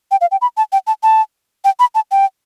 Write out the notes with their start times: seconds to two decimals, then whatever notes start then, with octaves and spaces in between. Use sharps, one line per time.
0.11 G5
0.21 F5
0.32 G5
0.42 B5
0.57 A5
0.72 G5
0.87 A5
1.03 A5
1.65 G5
1.79 B5
1.95 A5
2.11 G5